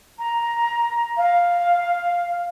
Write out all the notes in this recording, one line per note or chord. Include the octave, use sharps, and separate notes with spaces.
A#5
F5